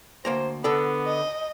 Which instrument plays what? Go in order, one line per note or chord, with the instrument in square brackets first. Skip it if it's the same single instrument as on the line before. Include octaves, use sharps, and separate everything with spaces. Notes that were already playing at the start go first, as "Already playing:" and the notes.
[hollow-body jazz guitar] D2 A#3 A#5 [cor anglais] C5
[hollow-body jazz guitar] D3 A4 [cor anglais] B3
[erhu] D#5